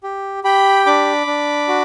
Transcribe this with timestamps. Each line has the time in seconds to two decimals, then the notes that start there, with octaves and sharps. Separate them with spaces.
0.03 G4
0.44 G4 G5 B5
0.86 D4 B5 D6
1.27 D4
1.68 F#4